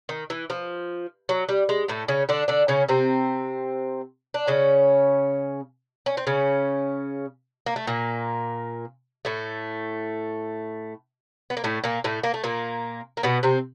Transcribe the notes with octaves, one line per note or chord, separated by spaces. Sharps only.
D#3
E3
F3
F#3
G3
G#3
A2 A3
C#3 C#4
D3 D4
D3 D4
C#3 C#4
C3 C4
D4
C#3 C#4
C#4
C4
C#3 C#4
A#3
A3
A#2 A#3
A2 A3
B3
A#3
A2 A3
A#2 A#3
A2 A3
A#3
A3
A#2 A#3
A#3
B2 B3
C3 C4